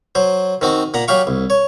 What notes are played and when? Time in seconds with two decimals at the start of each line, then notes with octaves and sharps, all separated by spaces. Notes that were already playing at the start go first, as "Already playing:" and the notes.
0.15 F#3 C5
0.61 D#3 C4 F#4
0.94 A#2 F#5 A#5
1.08 F#3 G4 F5 C#6
1.27 C2
1.50 C#5